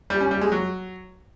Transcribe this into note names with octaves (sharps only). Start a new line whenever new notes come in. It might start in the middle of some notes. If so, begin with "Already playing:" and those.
G3
C#4
G3
G#3
F#3